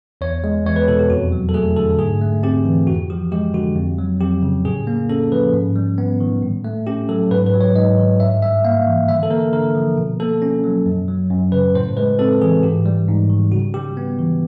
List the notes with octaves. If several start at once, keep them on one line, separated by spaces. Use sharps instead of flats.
E2 C#5
G#3
E2 C#5
B4
B2 A4
G4
F2 F#4
F#3
A4
A3 G#4
D3 A4
G#2 G#4
A3
C4 G4
E3
F2 F#4
F3 G4
G#3 G4
D3 F#4
F2
F#3
F2 G4
C#3
A2 G#4
A#3
C#4 A4
F3 B4
G#2
G3
B3
D#3
A2
A3
C#4 G4
F#3 A4
G#2 B4
B4
F#3
C#5
G#2 D#5
D#3
G2 E5
G3 E5
A#3 F5
E3
D3 E5
A4
A#3 A#4
D3 A#4
F3
B2
A#3 A4
C#4
F#3
F#2
F#3
F#2
C#3 B4
A2 C5
G#3 B4
C4 A4
E3 G#4
G#2 G4
G3
G#2
D#3
C#3 F#4
G3 G4
B3
E3